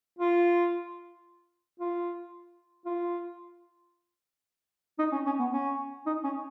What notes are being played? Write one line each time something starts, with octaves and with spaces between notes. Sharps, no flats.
F4
F4
F4
D#4
C#4
C#4
B3
C#4
D#4
C#4